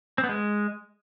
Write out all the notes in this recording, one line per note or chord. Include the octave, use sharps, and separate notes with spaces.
C4
B3
G#3